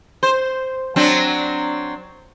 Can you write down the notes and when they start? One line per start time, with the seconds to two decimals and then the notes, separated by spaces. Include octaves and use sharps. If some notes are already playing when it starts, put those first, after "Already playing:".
0.23 C5
0.96 F#3 C4 D4